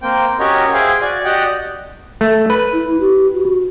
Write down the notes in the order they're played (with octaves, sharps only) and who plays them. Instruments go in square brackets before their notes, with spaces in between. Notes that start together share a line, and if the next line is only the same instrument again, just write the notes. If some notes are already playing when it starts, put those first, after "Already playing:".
[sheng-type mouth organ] A#3 C4 G5
C#4 F#4 G4 A#4 C#5 D#5
G#4 C5 E5 F5 G5 G#5
F#4 D5 G#5
F#4 G4 D5 D#5 F#5 G5
[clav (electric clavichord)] A3
B4
[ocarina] E4
G4
F#4